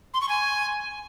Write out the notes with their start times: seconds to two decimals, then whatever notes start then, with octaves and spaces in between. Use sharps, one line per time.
0.14 C6
0.21 C#6
0.29 G#5